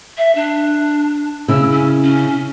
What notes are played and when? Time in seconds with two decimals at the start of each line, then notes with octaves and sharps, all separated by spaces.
0.17 E5
0.35 D4
1.48 C#3 E4 E6
1.71 C#4
2.03 C#4